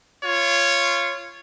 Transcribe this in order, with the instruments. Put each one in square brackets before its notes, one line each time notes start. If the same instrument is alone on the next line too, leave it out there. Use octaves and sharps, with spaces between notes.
[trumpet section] F4 C#5